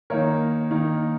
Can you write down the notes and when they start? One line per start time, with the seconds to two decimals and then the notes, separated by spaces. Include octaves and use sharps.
0.10 D#3 A#3 D#4 A#4 C#5
0.71 D#3 A#3 D#4